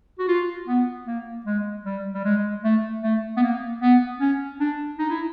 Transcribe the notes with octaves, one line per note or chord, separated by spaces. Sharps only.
F#4
F4
B3
A#3
G#3
G3
G3
G#3
A3
A3
B3
A#3
B3
C#4
D4
D#4
E4